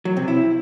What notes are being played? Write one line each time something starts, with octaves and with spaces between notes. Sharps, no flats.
F#3
C3
E4